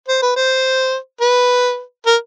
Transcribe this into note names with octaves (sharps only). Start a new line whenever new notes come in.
C5
B4
C5
B4
A#4